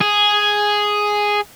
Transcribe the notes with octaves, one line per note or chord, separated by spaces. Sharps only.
G#4